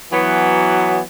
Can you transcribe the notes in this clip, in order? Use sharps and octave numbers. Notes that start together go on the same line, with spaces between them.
E3 F#3 B3